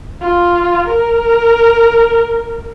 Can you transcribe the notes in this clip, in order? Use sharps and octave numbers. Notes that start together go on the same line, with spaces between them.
F4
A#4